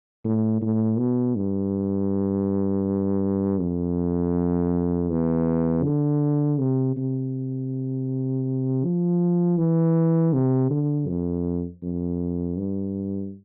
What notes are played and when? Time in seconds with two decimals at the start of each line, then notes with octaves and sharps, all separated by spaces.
0.25 A2
0.62 A2
0.99 B2
1.36 G2
3.61 F2
5.10 E2
5.84 D3
6.60 C3
6.97 C3
8.84 F3
9.58 E3
10.33 C3
10.71 D3
11.08 F2
11.83 F2
12.58 G2